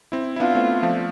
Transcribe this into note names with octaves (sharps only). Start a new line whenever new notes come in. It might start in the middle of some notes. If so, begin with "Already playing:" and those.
C4 E4
E4
B3 D4 F4
A3 C4
F3 A3